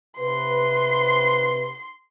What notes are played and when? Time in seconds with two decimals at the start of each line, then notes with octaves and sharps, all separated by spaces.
0.18 C3 B4 C6